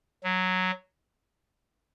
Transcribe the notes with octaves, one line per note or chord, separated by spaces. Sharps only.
F#3